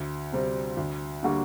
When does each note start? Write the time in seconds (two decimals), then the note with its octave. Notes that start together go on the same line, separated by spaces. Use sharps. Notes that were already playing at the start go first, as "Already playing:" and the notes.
Already playing: D2
0.32 C3 G3 C4
0.77 D2
1.23 D3 G3 A#3 F#4